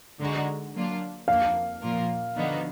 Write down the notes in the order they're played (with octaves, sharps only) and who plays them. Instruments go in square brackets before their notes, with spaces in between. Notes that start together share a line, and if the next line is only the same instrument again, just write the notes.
[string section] D3 G#3 D#4 F#4
F#3 A#3 D4 F4
[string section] F2 F3 A#3 D4 [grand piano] F5
[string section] A#2 F3 A#3 F4 A#4
D3 F3 B3 D#4 F#4